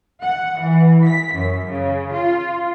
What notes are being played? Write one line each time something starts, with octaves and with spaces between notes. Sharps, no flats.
F#5
E3
B6
F#2
C#3
F4